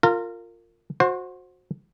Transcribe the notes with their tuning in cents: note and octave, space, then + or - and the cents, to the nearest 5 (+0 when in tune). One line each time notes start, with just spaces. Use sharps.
F4 +0 A#4 -25
F#4 -20 C5 +15